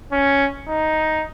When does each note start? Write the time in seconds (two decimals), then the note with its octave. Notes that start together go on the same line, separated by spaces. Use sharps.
0.12 C#4
0.68 D#4